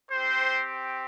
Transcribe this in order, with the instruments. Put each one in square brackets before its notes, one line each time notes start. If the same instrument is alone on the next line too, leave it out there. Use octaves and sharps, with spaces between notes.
[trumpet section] C4 G4 C5